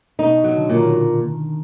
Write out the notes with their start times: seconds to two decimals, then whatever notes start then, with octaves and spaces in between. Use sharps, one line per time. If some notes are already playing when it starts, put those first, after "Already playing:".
0.19 B2 D#4
0.37 B2
0.44 F#3
0.57 D3
0.69 A#2
0.77 D#3